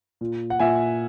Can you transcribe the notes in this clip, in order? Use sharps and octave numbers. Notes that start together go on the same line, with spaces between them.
A#2
F#5
A#2 E5 G#5